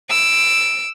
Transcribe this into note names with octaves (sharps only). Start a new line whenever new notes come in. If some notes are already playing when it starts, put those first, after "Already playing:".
E6 D7